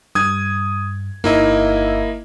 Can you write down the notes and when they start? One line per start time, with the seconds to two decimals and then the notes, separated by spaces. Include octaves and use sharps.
0.15 G2 D#6 G#6
1.24 G1 A#3 D#4 E4 D#5 E5